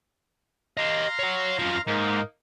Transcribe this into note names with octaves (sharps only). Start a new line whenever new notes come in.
G4 D#5 F5 A#5 C6
C#5 F#5
F#2 F3
G#2 A#3 D#4